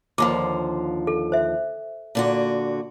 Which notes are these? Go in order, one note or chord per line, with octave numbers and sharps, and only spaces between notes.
D#2 D3 F3 D6
A4
C5 E5
A#2 D3 F#4